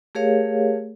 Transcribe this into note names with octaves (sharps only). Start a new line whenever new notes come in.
A3 G4 G#4 A#4 C#5 F5